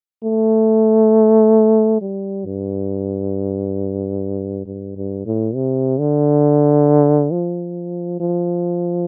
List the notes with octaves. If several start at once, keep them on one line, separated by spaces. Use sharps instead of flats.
A3
G3
G2
G2
G2
A2
C3
D3
F3
F3